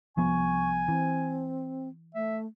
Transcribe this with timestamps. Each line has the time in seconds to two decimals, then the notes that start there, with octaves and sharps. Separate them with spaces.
0.17 C2 F3 B3 G#5 C#6
0.88 E3 C4
2.15 A3 E5